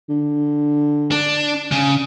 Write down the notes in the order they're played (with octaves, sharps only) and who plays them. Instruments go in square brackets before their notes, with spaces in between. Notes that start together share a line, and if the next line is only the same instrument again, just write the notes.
[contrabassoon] D3
[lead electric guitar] D4
C#3